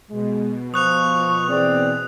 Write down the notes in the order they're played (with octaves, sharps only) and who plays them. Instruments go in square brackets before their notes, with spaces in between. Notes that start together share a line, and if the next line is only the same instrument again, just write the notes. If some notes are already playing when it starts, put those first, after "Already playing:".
[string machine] B2 [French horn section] G#3
[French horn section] F3 C5 [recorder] C#6 [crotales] D#6 F#6 F7
[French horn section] E3 C4 G#4 [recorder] D5